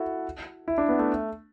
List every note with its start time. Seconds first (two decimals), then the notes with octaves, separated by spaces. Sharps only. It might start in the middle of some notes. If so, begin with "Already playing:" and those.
Already playing: E4 F#4 A4
0.68 E4
0.78 D4
0.89 B3
0.99 A3